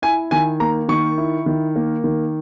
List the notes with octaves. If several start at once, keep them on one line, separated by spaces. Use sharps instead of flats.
E4 G#5
D#3 G#5
A#3 A#5
D#3 C#6
E4
D#3
A#3
D#3